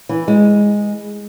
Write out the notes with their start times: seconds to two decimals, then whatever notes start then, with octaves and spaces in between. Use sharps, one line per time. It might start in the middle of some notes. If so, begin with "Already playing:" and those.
0.09 E3
0.28 G#3